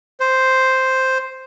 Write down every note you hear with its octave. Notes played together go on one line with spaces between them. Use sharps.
C5